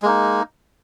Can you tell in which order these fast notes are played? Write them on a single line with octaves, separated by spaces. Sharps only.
G#3 A#3 D#4